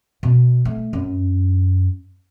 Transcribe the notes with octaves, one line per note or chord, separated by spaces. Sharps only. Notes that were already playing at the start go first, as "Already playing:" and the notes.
B2
A3
F#2